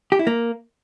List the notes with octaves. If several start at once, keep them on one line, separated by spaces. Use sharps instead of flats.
G4
E4
A#3